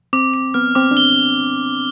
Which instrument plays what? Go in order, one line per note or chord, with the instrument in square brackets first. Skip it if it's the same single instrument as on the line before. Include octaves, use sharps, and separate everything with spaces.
[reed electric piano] C4 [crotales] D6
[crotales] D6
[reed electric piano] B3 [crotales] F6
[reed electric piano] C4 [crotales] D6
[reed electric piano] D4
[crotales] G7